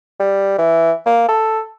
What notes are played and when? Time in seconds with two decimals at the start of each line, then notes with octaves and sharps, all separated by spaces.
0.20 G3
0.58 E3
1.06 A#3
1.29 A4